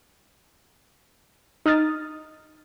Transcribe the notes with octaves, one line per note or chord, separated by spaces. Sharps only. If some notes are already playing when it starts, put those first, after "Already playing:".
D#4 D#6 F6 A6